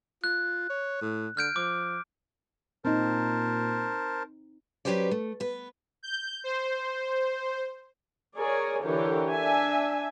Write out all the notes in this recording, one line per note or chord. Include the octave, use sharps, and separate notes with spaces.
F4 F#6
C#5
A2
D3 F6 G6 D7
F3 D6
A#2 C4 D#4 A#4 C5 A5
F#3 C#4 G4 B4 C5 D5
A3
B3 B4
G6
C5
G#4 A#4 C#5 D5 G#5
D3 E3 G4 A#4 C#5
D4 E5 G#5